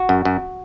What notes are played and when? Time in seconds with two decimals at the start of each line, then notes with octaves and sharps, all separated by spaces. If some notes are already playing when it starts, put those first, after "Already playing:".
Already playing: F#4
0.09 F#2
0.25 F#2